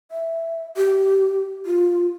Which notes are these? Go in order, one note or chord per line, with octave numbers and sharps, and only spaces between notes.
E5
G4
F4